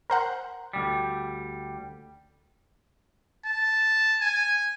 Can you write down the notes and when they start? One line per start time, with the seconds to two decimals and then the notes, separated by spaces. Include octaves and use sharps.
0.10 A#4 C5 F#5
0.73 D2 G3
3.45 A5
4.21 G#5